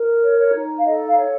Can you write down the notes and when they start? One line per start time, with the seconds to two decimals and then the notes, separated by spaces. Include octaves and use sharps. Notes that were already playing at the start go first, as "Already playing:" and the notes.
Already playing: A#4
0.22 C#5
0.37 C#5
0.53 D#4
0.78 F5
0.85 A4 D#5
1.08 F5
1.16 C#5